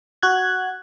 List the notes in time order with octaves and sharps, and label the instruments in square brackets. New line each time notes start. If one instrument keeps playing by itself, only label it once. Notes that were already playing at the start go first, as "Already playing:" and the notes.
[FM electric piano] F#4 F#6 G#6